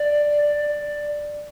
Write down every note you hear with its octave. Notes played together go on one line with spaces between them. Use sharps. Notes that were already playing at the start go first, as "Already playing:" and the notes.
Already playing: D5
D5